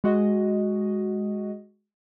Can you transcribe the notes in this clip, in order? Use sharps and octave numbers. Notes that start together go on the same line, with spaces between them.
G#3 F#4 D#5